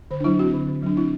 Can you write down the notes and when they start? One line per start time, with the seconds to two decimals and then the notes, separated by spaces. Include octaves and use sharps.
0.11 D3 C5
0.20 D4
0.24 F#3 E4
0.39 C4 F#4
0.53 D3
0.68 D3
0.83 F#3 D4
0.97 C4 E4